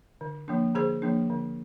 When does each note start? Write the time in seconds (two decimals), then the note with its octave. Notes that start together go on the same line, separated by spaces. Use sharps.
0.21 D3
0.48 F3 A#3 D4
0.75 D3 G#4 C5
1.02 F3 A#3 D4
1.29 D3